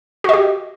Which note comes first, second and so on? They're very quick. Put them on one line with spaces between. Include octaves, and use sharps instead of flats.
F#4 D#5 G4